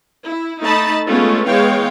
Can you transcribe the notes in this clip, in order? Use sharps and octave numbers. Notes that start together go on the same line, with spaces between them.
E4
A3 D#4 D#5 A5 B5
G#3 A3 B3 C#4 F4
E3 G#3 B3 C#5 F5 G5